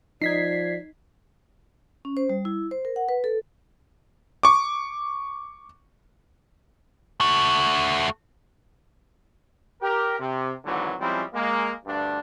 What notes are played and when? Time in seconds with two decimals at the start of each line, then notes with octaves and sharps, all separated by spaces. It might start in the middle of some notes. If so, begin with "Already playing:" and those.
0.22 F3 D#4 D5 G#6 B6 C7
2.05 C#4
2.17 C5
2.29 G3
2.45 E4
2.71 C5
2.85 A#4
2.96 F#5
3.09 B4
3.24 A4
4.43 C#6 D6
7.21 A3 F#4
9.82 G4 A#4
10.20 C3
10.65 G#1 C#2 G#2 D3 E3 F#3
11.00 F3 G3 G#3 C4 C#4 E4
11.33 G#3 A#3
11.86 D2 G2 D4